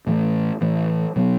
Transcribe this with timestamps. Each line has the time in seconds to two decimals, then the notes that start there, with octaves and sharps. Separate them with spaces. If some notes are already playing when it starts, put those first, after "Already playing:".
0.07 A2 E3 A3
0.61 A2 E3 A3
1.16 B2 F#3 B3